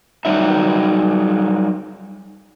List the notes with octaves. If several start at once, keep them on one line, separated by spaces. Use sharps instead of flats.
F#3 G3 D#4 E5